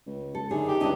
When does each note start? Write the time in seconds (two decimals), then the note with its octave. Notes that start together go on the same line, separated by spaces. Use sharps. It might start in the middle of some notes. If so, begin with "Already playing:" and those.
0.06 C#2
0.35 A4
0.51 F#2 D3 D#4 G#4
0.68 G4
0.81 C#2 D4 E4 B4 D#5